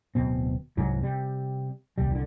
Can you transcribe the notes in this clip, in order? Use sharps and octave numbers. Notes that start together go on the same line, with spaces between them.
D1 B2 C4
C2 G#2 F#3
C3 G3
D#1 C2 G3
C2 D3